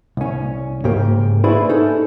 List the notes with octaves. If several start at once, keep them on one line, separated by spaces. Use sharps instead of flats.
C2 C#4
G#2 C#3 A#3 G4
E4 F#4 G#4 B4 C5 D5
C#4 D#4 A4